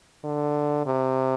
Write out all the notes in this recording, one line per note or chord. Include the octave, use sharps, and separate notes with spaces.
D3
C3